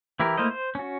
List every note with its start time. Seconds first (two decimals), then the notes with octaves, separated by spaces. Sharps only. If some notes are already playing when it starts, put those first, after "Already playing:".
0.20 E3 E4 G4 A#4
0.37 A3 A#3 E4 C5 D#5
0.50 C5
0.75 C#4 F#4